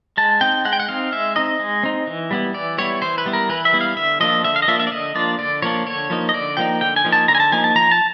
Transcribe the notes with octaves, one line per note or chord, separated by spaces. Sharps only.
G#3 A5
C4 D#4 G5
G#3 F#5
G5
F#5
C4 D#4 F5
G#3 E5
C4 D#4 D#5
G#3
C4 D#4
E3
G3 B3 E4
E3 D5
G3 B3 E4 C#5
E3 C5
B4
G3 B3 E4
A#4
E3 B4
E5
G3 B3 E4
F5
D3 E5
F3 A#3 D4 F4 D#5
D3 E5
F5
D#5
F3 A#3 D4 F4 E5
E5
D5
D3 D#5
F3 A#3 D4 F4 D5
D3 D5
F3 A#3 D4 F4 C#5
D3 C#5
F3 A#3 D#4
D#5
D3 D5
F3 A#3 D#4 G5
D3 G5
G#5
F3 A#3 D#4
A5
D3 A#5
G#5
A5
F3 A#3 D#4 G#5
A5
F3 A#5
A5